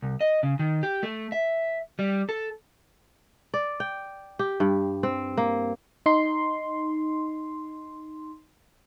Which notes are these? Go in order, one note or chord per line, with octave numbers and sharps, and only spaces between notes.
C2
D#5
C#3
D#3
G4
A3
E5
G3
A4
D5
G5
G4
G2
C4
A#3
D#4 C6